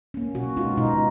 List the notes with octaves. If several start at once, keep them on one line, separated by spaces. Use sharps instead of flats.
A#3 C#4
B2 F#4
G#3 B3 D#4 F4
B2 D#4